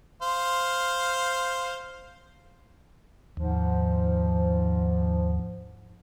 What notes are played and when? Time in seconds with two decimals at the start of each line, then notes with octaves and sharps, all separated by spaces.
0.22 C5 F5
3.37 D#2 G#2 F3